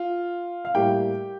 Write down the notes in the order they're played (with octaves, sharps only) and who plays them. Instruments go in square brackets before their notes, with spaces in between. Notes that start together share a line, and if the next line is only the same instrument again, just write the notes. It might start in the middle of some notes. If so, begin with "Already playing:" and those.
Already playing: [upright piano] F4
F5
A2 G3 A#3 G4 G5